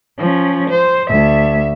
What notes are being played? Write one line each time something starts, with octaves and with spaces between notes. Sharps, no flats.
F3 C#4
C5
D2 E5